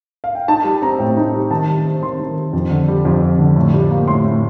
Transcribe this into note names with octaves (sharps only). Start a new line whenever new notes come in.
F5
G5
D#4 A5
G3
C4 A#5
A2 G5
D#4
G3
D#3 A5
G3
C4
D#3 C6
D#3
G3
F2
D3
G3
F2
F2
D3
A2
G3
A#3
A2 C6
A2